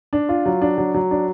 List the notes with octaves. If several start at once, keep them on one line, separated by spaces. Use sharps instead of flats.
D4
F4
F#3
D4
F#3
F#3
D4